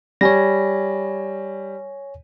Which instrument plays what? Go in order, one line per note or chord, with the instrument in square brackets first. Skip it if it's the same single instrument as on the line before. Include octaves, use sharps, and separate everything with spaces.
[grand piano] G3 [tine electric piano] C#5 G#5 A#6